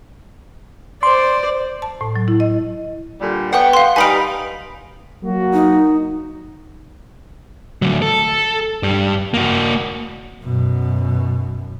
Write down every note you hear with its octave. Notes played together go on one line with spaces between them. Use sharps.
C5 D5 C6
A5
A2
F#3
E4
D#5
A#2 D3 G3
B3 F#5 G5 C#6
F5 C6
G3 D#4 B4 F5 G#5 B5 D7
F#3 A#3 F#4
D#4
D2 F#3
A4
G2 G3
A#3 F#4
F#2 B2